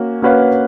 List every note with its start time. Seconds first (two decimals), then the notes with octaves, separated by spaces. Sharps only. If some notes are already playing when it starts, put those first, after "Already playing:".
Already playing: A#3 C#4 F#4
0.22 A#3 C#4 F#4 B4 F5